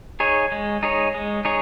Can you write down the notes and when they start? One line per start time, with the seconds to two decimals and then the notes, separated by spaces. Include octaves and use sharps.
0.20 D#4 G#4 C#5
0.52 G#3
0.83 D#4 G#4 C#5
1.14 G#3
1.45 D#4 G#4 C#5